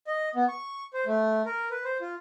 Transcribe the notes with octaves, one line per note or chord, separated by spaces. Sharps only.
D#5
B3
C#6
C5
A3
A#4
B4
C5
F4